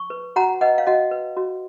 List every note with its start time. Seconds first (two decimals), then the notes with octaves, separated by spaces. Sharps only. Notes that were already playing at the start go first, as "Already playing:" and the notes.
Already playing: C#6
0.10 B4
0.36 F#4 F#5 A#5
0.61 B4 D#5 F#5
0.78 F5
0.87 F#4 D#5 F#5
1.11 B4
1.37 F#4